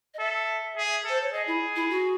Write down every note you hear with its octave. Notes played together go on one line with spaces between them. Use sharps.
D#5
A4 E5
G#4
A4 C5
C#5
G#4 D#5
E4
E4
F#4